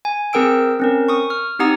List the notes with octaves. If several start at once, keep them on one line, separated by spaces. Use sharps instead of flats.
G#5
C4 G#4 A#4 G5 E6 D7
C4 C#4 A#4
C#6 D#6
F6
C4 D#4 G4 F#5 A#5 D#6